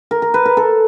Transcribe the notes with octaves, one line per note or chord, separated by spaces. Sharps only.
A#4
A#4
B4
A#4
A4